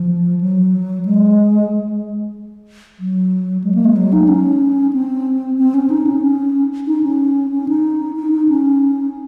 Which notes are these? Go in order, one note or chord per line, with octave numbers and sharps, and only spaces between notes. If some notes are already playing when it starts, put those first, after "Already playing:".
Already playing: F3
F#3
G#3
F#3
G#3
A#3
G#3
F#3
D#4
C#4
C4
C4
C#4
D#4
C#4
C#4
D#4
C#4
C#4
D#4
D#4
D#4
C#4